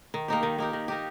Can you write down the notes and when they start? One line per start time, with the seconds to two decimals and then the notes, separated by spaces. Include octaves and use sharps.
0.14 D#3
0.28 A#3 D#4 G4
0.43 D#3
0.58 A#3 D#4 G4
0.73 D#3
0.88 A#3 D#4 G4